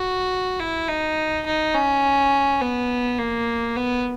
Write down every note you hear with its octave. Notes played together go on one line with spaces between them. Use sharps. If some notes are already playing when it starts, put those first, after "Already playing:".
Already playing: F#4
E4
D#4
D#4
C#4
B3
A#3
B3